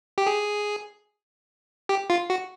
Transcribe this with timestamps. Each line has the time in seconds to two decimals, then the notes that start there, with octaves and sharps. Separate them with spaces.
0.18 G4
0.27 G#4
1.89 G4
2.10 F4
2.30 F#4